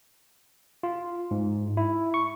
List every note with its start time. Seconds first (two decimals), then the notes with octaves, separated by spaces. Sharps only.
0.83 F4
1.31 G#2
1.77 E4
2.14 C#6